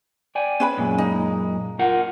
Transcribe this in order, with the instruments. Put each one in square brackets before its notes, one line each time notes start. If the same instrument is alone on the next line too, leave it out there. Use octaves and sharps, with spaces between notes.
[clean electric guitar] D5 G5 G#5
[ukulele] C#4 B4 B5
[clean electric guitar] F#2 A#2 G#3
[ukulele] D#4
[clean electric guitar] F4 A#4 F#5